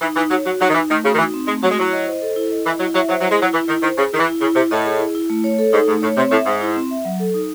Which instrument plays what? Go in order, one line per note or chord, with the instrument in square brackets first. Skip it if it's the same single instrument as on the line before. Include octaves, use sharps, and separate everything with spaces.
[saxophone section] E3 [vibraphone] D#4
[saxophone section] E3 [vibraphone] D#4
[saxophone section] F#3 [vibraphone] C#5
[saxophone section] F#3 [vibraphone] F#4
[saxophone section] F#3 [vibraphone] D#4
[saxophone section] D#3
[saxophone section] E3 [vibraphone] D#4
[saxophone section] D#3 [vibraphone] A3
[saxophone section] C#3 [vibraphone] F#4
[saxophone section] D#3
[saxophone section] E3 [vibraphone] D#4
[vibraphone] C4
[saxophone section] G#3 [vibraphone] A3
[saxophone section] F#3 [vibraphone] F#4
[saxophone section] G#3
[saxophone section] F#3 [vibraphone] E4
[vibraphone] D#5
C5
A4
E4
D#5
[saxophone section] E3 [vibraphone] E4
[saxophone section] F#3 [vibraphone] E4
[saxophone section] F#3 [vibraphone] E5
[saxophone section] F#3 [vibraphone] C5
[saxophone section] F#3
[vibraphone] E4
[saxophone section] G#3
[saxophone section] F#3 [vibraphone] E4
[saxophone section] E3 [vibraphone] E4
[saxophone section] D#3 [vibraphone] E4
[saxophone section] D#3 [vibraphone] C5
[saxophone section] C#3 [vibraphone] G#4
[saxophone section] D#3 [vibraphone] E4
[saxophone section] E3
[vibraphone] E4
[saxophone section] C#3 [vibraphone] E4
[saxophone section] C3 [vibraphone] E4
[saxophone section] A2 [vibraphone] D#5
[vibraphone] G#4
E4
E4
A3
C#5
A4
[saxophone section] G#2 [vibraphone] D#4
[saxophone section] G#2 [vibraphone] A3
[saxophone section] A2 [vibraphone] C#5
[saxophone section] C3 [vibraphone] C4
[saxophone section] A2 [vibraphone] E5
[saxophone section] G#2 [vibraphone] C5
[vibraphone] E4
C4
E5
F#3
A4
D#4